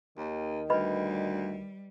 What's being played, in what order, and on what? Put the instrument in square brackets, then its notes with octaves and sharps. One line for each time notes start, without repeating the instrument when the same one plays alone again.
[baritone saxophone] D#2 [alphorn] D#3
[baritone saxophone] D2 [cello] G3 [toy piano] B4 D#5 B5